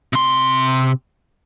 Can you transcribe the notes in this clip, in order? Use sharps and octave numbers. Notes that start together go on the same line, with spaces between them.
C3 C6